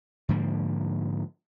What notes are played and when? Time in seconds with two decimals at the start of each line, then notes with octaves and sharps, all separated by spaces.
0.29 G#2 D3 F3 A#3